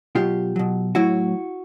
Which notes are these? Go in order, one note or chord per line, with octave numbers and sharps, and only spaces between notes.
B2 F#3 F4 G4
B2 F#3
A2 F#3 E4 F#4